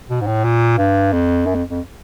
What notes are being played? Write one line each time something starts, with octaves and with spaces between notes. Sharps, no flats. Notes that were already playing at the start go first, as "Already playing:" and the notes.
B2
G#2
A2
A#2
G2
F2
F#2
F2
F2